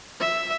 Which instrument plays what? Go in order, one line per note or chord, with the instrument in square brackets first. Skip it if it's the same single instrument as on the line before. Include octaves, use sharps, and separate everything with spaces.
[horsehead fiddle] E5